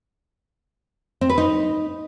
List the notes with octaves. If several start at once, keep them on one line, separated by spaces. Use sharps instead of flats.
C4
B4
D#4